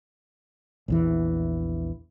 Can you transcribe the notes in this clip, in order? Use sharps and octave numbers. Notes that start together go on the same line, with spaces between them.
A#1 E2 E3